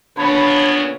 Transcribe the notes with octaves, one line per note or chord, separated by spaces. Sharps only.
A#2 C#3 B3 D4 C#5 A5 B5